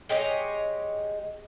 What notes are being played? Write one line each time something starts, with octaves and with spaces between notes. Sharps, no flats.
G#3 G4 C#5 D#5